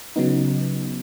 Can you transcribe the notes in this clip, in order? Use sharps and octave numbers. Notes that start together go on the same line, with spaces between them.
C#3 F#3 B3 D#4